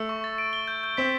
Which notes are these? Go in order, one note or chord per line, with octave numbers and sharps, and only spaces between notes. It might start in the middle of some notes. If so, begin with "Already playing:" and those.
Already playing: A3 E6
C#6
A6
D7
G7
G6
G6
C4 B6